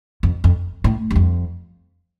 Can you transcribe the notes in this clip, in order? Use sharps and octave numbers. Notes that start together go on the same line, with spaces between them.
F2
F2
A2
G2
F2